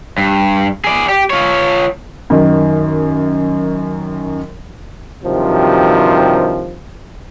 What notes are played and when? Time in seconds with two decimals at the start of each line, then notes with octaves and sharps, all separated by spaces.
0.18 G2
0.84 G#4 D5
1.09 G4
1.30 F4 C#5
2.30 F#2 D#3
5.24 G2 C3 D#3 F3 F#3